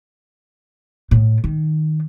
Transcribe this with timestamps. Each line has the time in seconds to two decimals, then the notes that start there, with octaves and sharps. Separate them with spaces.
1.11 A2
1.44 D#3